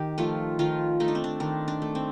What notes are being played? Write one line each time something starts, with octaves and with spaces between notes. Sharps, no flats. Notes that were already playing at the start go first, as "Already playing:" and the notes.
Already playing: D#3 G4
F3 A3 F4
D#3 F3 F4
A3 D#4
D4
C4
D4
D#3 D4
D4
A3
C4